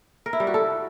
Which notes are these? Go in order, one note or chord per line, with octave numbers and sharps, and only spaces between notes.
A#4
E4
G3
F#4
A4